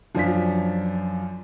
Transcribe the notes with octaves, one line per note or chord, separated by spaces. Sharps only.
F#2 F3 D4 F4 B6